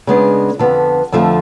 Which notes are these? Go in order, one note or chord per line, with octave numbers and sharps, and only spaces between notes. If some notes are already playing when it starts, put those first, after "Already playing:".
C#3 G#3 B3 D4
F2 D3 F3 B3
F2 D3 F3 A3 F4